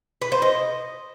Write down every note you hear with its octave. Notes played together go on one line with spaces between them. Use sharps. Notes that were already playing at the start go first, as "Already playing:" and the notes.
B4
C5
D#5